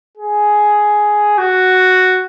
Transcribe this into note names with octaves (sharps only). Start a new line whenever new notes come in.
G#4
F#4